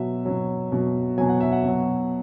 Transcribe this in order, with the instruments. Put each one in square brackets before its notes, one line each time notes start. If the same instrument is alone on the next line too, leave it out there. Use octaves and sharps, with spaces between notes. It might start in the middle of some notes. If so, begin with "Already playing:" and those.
Already playing: [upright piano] B2 F#3 E5
B2 F#3
B2 F#3
B2 F#3 G#5
F#5
E5
F#5
B2 F#3